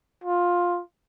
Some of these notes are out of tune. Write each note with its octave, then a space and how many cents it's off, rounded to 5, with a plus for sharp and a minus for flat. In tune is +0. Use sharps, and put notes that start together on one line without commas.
F4 +10